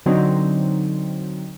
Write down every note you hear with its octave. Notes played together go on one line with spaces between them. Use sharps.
D3 F#3 C4 D#4